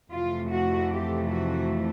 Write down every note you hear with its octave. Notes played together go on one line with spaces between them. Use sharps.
F2 C3 E3 A3 F4
F#4
G4
F#4